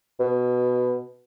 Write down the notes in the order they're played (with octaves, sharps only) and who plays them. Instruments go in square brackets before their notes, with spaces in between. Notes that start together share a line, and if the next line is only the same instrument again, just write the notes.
[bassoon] B2